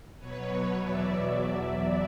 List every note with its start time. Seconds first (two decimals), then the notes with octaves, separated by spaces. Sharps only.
0.18 B2 F#3 B4 C#5
0.78 E2 B2 F#3 D5 E5